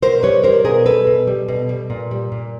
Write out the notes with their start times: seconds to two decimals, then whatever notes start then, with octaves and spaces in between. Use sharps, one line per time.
0.02 B2 A#4 C5
0.23 G3 B4 C#5
0.44 G3 A#4 C5
0.65 B2 G#4 A#4
0.86 G3 A4 B4
1.07 B2
1.27 G3
1.48 B2
1.69 G3
1.90 A#2
2.11 G3
2.32 A#2